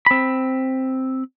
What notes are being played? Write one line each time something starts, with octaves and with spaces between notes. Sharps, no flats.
C4 B5